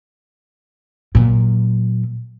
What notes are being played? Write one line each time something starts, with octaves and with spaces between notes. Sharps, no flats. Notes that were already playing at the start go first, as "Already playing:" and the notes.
A#2 F#3